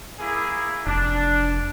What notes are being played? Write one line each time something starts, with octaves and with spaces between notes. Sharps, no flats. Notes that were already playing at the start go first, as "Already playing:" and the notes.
A#3 E4 G#4
F1 D4